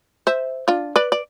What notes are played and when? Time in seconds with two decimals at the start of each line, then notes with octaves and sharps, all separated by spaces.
0.27 C5 E5
0.68 D4 F4
0.96 B4 D5
1.12 D5